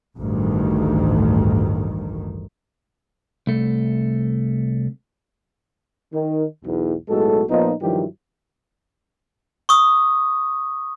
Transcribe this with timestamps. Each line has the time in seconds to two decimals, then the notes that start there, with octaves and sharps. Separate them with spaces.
0.17 A1 D2 G2 D#3
3.47 C2 A3
6.14 D#3
6.64 B1 E2
7.09 B1 A2 G#3 F#4 A4
7.50 A#2 F3 B3 D#4
7.82 G2 D#3 F3 F#3 E4 G4
9.69 C#6 D#6